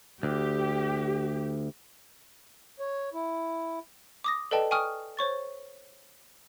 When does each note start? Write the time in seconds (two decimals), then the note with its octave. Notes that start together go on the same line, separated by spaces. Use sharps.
0.23 D2 G4
2.80 C#5
3.14 E4
4.24 D6 D#6 A#6
4.51 A4 B4 D5 D#5 G5 A5
4.71 G5 G#5 C#6 D#6 F6
5.17 C5 C#5 C#6 A6